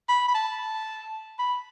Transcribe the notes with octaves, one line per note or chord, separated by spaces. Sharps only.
B5
B5
A5
B5